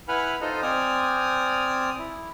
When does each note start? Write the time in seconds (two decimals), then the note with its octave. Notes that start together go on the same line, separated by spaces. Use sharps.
0.08 E4 B4 F#5 G#5 B5 F6
0.41 D#4 F4 A4 C5 D#5
0.62 C4 D5 G#5 D#6 F6
1.99 E4